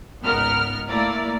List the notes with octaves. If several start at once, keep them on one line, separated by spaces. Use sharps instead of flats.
G#1 C#2 B3 A#4 F6
A3 A#3 E4 A#4 D5